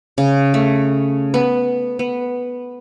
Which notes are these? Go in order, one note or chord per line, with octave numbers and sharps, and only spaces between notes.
C#3
A3
B3
B3